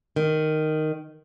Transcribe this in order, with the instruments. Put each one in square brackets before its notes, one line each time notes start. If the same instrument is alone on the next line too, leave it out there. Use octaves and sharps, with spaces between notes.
[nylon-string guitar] D#3